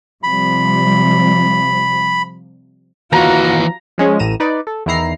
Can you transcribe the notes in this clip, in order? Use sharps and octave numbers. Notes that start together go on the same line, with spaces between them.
C3 F3 G3 B5
D#2 E3 F4 F#4 A#5
F3 G#3 C#4 F4
A1 A2 A#5 D#7 E7
D#4 B4 D5
A4
E2 D#3 E4 A#5 C7